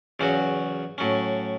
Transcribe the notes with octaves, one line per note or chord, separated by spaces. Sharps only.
E2 C#3 F#3 C#4 F#4
A2 F#3 C#4